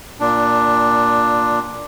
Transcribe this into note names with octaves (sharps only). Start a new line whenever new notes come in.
A#2 D4